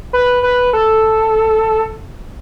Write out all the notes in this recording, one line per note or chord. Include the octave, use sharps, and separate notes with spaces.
B4
B4
A4